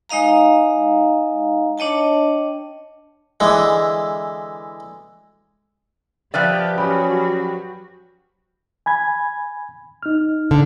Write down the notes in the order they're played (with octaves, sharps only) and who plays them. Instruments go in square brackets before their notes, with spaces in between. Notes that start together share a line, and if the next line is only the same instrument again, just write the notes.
[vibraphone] G#3 D#4 D#5 F5 A#5
D4 C#5 D#5 G5 A5
[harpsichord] D3 E3 G#3
[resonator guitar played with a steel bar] F3 B4 D5 [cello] G4 [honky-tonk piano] E5 G5 F6
[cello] F#3 F#4 [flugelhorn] C#4 [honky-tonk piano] G4 B5 D#6
[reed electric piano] G#5 B5 G#6
D#4 F6
[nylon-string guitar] D3